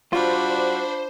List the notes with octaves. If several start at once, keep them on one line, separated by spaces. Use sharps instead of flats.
G3 D4 F4 F#4 C5 B5